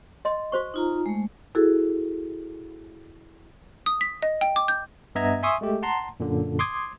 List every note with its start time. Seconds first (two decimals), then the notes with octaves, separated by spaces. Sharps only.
0.25 D#5 C6
0.52 F#4 C5 C#6
0.74 D#4 F4 A#5
1.06 G#3 A3
1.55 E4 F#4 G#4 A4
3.86 D#6
4.01 B6
4.23 D#5
4.41 G5
4.56 D6
4.68 G6
5.15 G2 B3 D#5 E5 A#5 G#6
5.43 E5 G#5 C6 C#6 D#6 E6
5.61 G#3 A3 G4
5.83 F#5 A5 A#5 C6
6.20 F#2 A#2 D3
6.59 C6 D6 D#6 G#6